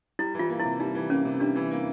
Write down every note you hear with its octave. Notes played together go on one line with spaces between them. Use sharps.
G3 E4
E3
F4
A#3
C3 E4
G3 D#4
E3
A#3 C#4
C3
G3 D4
E3
A#3